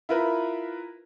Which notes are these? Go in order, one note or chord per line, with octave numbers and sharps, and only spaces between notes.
E4 F4 A#4 B4